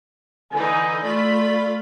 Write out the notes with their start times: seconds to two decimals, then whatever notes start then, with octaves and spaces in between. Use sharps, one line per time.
0.53 D3 E3 D#4 G#5
1.03 A3 F4 D5 B5